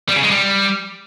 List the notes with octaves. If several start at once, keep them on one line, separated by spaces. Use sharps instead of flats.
G3
C#3
G#3
G3